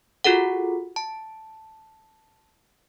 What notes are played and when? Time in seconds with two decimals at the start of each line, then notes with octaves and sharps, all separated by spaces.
0.24 F4 F#4 G#4 A4 F#5
0.96 A5